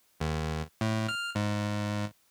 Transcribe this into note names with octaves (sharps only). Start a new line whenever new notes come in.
D#2
A2
F6
G#2